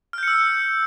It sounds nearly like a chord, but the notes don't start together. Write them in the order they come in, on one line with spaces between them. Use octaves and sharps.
F6 G6 C#7 E6